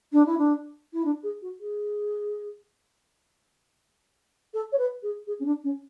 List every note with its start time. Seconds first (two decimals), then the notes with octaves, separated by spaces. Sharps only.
0.13 D4
0.26 E4
0.38 D4
0.93 E4
1.05 D4
1.23 G#4
1.42 F#4
1.60 G#4
4.54 A4
4.72 C#5
4.78 B4
5.03 G#4
5.27 G#4
5.40 C#4
5.45 D4
5.64 C#4